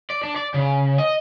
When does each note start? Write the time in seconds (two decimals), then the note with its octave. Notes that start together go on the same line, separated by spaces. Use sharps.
0.10 D5
0.23 D4
0.36 D5
0.54 C#3
0.98 D#5